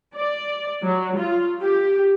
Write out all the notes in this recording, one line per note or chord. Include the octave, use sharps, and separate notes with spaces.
D5
F#3
F4
G4